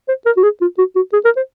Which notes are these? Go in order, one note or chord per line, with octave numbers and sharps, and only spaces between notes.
C5
A#4
F#4
G#4
F4
F#4
F#4
G#4
A#4
C5